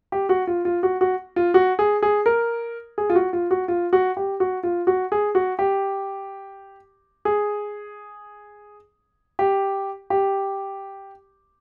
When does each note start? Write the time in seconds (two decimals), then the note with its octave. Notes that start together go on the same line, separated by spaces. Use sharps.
0.12 G4
0.29 F#4
0.47 F4
0.65 F4
0.83 F#4
1.01 F#4
1.36 F4
1.54 F#4
1.79 G#4
2.03 G#4
2.26 A#4
2.98 G#4
3.10 F4
3.15 F#4
3.33 F4
3.51 F#4
3.68 F4
3.93 F#4
4.17 G4
4.40 F#4
4.63 F4
4.87 F#4
5.12 G#4
5.35 F#4
5.59 G4
7.25 G#4
9.39 G4
10.10 G4